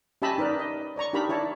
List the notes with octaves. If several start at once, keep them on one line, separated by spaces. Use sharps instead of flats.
C#4 G4 D#5 E5 A5 B5
D#4 A#4 B4 D5
D#5
C#5 D5 A#5 C#6
D4 D#4 G4 A#4 A#5 B5
E4 C#5 D5 A5